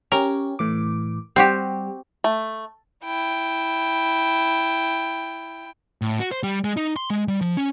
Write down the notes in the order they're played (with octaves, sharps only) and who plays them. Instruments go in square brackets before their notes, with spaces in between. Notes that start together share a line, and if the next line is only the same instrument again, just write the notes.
[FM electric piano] C#4 G4 C#5 [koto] A#4
[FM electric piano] A2 E3 D6
[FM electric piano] G3 [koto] C4 F#4 G4
[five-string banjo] A3
[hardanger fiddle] E4 G5
[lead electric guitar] A2
F#4
C5
G3
G#3
D#4
C6
G#3
G3
F3
C#4